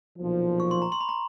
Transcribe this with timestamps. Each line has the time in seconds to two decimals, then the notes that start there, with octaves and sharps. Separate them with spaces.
0.18 B1 A#2 F3
0.60 C#6
0.71 C6
0.82 A#5
0.92 C6
1.01 B5
1.09 A#5